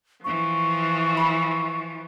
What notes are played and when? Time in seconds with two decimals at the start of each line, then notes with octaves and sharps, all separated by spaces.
0.24 E3 F3 C#6
1.17 B5 E6